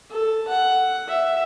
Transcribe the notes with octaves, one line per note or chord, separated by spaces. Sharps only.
A4
F#5
E5